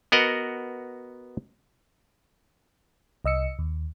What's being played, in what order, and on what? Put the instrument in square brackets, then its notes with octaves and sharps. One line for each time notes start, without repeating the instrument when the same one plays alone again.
[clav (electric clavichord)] B3 F#4 A#4 D#5 F#5
[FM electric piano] C2 D#5 E6 C#7
D#2